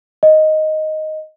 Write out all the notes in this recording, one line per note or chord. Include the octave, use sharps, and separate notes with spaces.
D#5